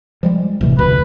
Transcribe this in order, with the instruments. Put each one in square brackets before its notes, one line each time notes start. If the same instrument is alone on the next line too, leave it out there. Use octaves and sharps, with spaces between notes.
[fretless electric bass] F3 G3 G#3
[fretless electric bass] D1 E3 [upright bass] C3 A3
[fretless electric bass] F1 D2 [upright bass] D4 [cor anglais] B4